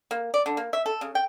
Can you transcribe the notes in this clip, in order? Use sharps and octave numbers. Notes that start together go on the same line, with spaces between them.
A#3
D5
D3
A#3
E5
A4
C#3
G5